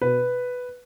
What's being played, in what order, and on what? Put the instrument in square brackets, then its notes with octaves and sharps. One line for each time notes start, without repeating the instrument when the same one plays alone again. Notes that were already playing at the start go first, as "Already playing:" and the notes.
[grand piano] B2 B4